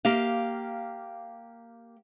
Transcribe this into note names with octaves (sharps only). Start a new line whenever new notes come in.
A#3 G4 F5